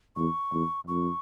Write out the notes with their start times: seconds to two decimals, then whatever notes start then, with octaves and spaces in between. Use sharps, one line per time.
0.16 E2 C#6
0.52 E2
0.87 F2 C#6